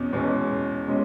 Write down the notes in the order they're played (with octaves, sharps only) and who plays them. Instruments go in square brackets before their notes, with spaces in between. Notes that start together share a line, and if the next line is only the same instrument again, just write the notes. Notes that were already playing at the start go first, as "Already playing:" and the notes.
Already playing: [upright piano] E2 B2 C#4
E2 B2 G#3 C#4
B2 G#3 C#4